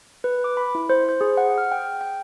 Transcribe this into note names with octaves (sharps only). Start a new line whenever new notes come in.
B4
D6
B5
E4
C5
C5
G#4
F#5
F6
G5
G5